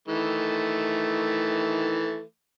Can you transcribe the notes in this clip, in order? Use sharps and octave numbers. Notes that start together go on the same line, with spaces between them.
D#3 E3 A3